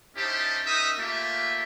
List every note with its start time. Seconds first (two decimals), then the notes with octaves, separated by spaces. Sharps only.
0.16 C#4 D#4 E4 G4 C5 A5
0.66 C#4 D#4 A#4 E5 D#6
0.98 A3 A#3 F4 G4 E5